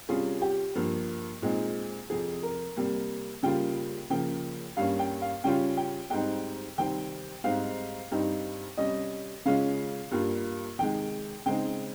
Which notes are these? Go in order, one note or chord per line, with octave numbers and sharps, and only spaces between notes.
C3 G3 C#4 F4 G#4
G4
G2 F3 A#3
A#2 G#3 C4 D#4
F2 C3 F3 G#4
A#4
C3 G3 A#3
C#3 G3 A#3 F4 G5
C#3 F3 A#3 G5
G2 G3 A#3 C#4 F5
G5
F5
C#3 G3 C#4 F4 G5
G5
G#2 G3 C4 D#4 G5
C3 D#3 G3 C4 G5
G#2 G3 C4 D#4 F5
G2 G3 C4 D#4
C3 G3 C#4 D#5
C#3 G#3 C#4 F4 F5
G2 G3 A#3 F4
C3 D#3 G#3 G5
C#3 G#3 C4 D#4 G5